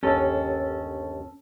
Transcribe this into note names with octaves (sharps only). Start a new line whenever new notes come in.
G1 D#2 C#4 A4 G5